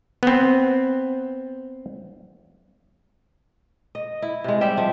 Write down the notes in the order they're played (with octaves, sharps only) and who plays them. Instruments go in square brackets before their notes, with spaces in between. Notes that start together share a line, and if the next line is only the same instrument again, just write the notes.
[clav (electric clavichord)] B3 C4
[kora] D#5
E4
C3 G#3
G3 G4 E5 G5
F3